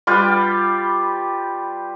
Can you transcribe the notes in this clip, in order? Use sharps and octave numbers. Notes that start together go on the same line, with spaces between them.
G3 F4 G4 B4